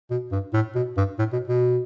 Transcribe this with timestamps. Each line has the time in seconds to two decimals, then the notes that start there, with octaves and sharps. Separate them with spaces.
0.11 B2
0.32 G2
0.53 A2
0.75 B2
0.97 G2
1.19 A2
1.33 B2
1.48 B2